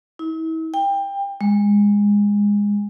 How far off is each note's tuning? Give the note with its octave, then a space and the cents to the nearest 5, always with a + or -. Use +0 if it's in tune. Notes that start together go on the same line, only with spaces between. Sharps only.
E4 -40
G5 +20
G#3 -20